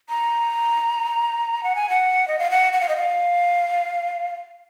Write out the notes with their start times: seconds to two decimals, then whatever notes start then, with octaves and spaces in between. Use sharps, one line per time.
0.09 A#5
1.63 F#5
1.75 G#5
1.90 F#5
2.28 D#5
2.39 F5
2.51 F#5
2.73 F#5
2.81 F5
2.89 D#5
2.96 F5